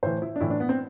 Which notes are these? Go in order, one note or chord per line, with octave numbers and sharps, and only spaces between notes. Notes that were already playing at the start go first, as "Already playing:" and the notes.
A2 E3 C5
E4
D4
A2 E3 E4
D4
B3
C4